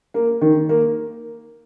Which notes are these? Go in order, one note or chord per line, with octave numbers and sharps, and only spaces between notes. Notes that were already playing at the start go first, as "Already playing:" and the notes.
A#3
D#3
A#3